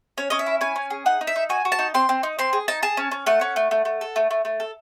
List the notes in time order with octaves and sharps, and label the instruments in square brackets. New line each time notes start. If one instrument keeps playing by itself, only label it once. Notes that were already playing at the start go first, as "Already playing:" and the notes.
[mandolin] C#4 C#5
C#4 D#5
E5
E4
C#4 G#5
C#4
G#4
D#4 F#5
D#4
E5
D#4
F#4 G#5
F#4
A5
D#4
C4 C6
C4
D#4
C4 C6
G#4
D#4 A5
G#4 A5
C#4
C#4
A3 F#5
C#4
A3
A3
A3
A4
A3
A3
A3
A4